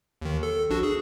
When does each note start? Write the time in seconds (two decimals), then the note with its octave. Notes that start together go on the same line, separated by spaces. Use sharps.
0.22 D#2 D#3
0.43 A4
0.70 A#1 D4 F#4
0.83 G#4